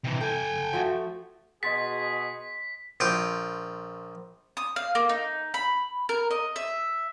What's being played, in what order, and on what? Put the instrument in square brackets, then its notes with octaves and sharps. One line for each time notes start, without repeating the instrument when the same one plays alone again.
[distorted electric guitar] C3 E3
[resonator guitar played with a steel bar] A4 [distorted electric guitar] G5 G#5
[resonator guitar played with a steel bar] F3 A3 F#4
[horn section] B2 F#4 G#4 [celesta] D#5 C6 A6 [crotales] B6
[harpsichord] A#1 F4 G5
[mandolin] D#6
F5
A#3
D#4
B5
A#4
D#5
E5